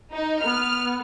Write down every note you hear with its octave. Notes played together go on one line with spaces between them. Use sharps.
D#4
B3 F6